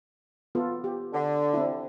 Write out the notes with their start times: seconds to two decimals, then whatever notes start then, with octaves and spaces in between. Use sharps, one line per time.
0.55 B3 F4 A4
0.84 G4
1.13 D3
1.54 C4 E4